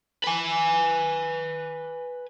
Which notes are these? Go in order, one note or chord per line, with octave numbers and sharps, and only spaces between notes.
B4 G#5